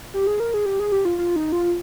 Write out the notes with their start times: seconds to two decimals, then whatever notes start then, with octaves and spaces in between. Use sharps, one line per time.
0.14 G4
0.27 G#4
0.40 A#4
0.54 G#4
0.66 G4
0.80 G#4
0.92 G4
1.05 F4
1.18 F4
1.36 D#4
1.52 F4